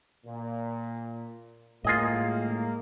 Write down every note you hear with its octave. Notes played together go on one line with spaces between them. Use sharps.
A#2
A2 G#3 A#3 F4 G#4 D#5